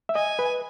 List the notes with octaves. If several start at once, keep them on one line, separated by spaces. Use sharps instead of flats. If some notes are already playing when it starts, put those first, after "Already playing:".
E5
D#5 G#5
B4